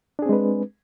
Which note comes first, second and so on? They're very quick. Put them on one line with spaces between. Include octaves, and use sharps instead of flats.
D4 G#4 C4 G#3 B4